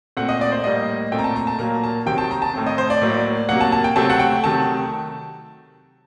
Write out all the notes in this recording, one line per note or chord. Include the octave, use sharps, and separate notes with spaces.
A#2 A3 C4 F#5
D#5
D5
C5
A2 G3 A#3 D#5
A#2 A3 C4 G5
A#5
A5
A#5
A5
A#2 F#3 A#3 A#5
A5
C3 D#3 F#3 C4 G5
A5
A#5
A5
A2 A3 C4
D#5
C5
D5
A2 F#3 A#3
C3 F#3 A#3 F#5
A5
A5
G5
C3 F#3 A3 C4 A5
F#5
G5
C3 D#3 F#3 A3 A5